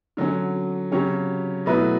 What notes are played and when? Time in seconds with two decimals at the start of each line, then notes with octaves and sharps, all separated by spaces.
0.17 D3 F#3 C#4
0.92 C#3 F#3 C#4 G4 C#5
1.66 B2 F#3 A3 E4 B4